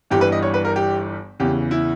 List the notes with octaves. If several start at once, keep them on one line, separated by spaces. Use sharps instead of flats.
G1 G2 E3 G3 G4
B4
D#5
C#5
B4
A#4
G4
E2 C#3 E3 G4
E4